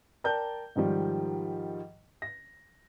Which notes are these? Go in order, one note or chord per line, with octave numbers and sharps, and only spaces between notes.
A#4 D5 G5 A5 A#5 G6
G#2 D#3 F3 G3
A#6